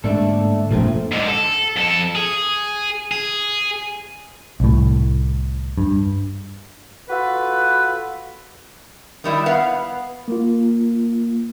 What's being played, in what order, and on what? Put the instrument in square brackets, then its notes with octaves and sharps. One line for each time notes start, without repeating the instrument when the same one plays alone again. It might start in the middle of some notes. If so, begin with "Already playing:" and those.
[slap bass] G#2 D3 A#3 [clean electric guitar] A3 D4 A4
[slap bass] E1 A#1 F#2 [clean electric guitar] A#2 A3 C4
[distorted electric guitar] G#2 D3
A4
F2 A4
G#4
G#4
[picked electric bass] C2 A2
G2
[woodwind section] F4 F#4 A4 B4
[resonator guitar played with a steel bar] D#3 G3 E4
B3 B4 F5 F#5
[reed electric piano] A#3 F4